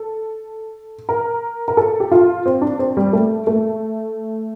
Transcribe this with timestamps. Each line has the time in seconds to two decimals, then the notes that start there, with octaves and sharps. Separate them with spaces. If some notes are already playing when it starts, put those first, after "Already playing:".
Already playing: A4
1.09 A#4
1.68 A#4
1.77 A4
2.00 G4
2.12 F4
2.46 C4
2.62 D4
2.79 C4
2.97 G3
3.13 A3
3.47 A3